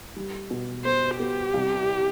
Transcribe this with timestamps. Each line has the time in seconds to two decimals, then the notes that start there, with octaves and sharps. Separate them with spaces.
0.16 G3
0.51 B2
0.85 B3 C5
1.19 B3 G4
1.54 C2